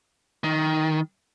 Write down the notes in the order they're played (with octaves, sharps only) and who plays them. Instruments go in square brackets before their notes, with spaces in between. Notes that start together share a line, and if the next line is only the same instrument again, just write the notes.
[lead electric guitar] D#3